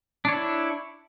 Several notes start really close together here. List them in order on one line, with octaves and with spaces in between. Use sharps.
D4 C#5 E4